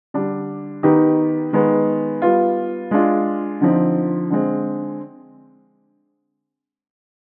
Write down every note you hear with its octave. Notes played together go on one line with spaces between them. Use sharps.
D3 G3 D4
D#3 B3 D#4 G4
D#3 G#3 B3
G3 B3 F4
G#3 D4 F4
D3 F3 C4 D#4
D3 G#3 C4